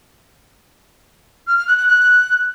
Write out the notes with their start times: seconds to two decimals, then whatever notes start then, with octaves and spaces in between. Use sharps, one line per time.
1.47 F6
1.57 F6
1.67 F#6
1.77 F#6
1.88 F#6